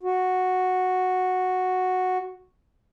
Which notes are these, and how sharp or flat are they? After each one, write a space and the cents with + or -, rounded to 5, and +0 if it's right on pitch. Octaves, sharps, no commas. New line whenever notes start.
F#4 -5